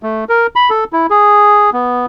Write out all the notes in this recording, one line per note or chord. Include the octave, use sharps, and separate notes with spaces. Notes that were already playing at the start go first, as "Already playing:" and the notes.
A3
A#4
B5
A4
E4
G#4
B3